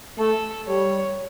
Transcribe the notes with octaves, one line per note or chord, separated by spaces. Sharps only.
A3 A4
G3 C#5